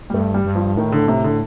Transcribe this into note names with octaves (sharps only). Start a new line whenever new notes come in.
G3
G2 A3
G3
G2
F3
A2 D#3
D3
C3
D3